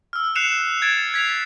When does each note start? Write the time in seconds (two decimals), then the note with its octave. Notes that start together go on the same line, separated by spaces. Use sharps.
0.13 E6 F6
0.35 F#6 C7 C#7 E7 F7
0.82 G#6 A6 D7 E7
1.14 G#6 B6 C7 F7